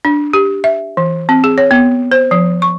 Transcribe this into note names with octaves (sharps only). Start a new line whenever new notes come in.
D4
G4
E5
E3
C4
G#4
C#5
B3
C5
F3
C#6